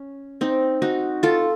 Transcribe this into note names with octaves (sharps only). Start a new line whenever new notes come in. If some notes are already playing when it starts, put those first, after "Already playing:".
Already playing: C#4
C4 D#4
D#4 F#4
F4 A4